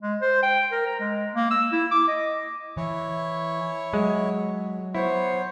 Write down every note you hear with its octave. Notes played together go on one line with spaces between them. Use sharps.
G#3
C5
G5
A#4
A#5
G#3
A#3
E6
E4
D6
D#5
E3 E4 C#5
F#3 G#3
B3 E4 C5 C#5